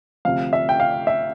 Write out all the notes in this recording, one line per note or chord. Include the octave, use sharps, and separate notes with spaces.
D2 C3 F3 F5
E5
G5
F5
E5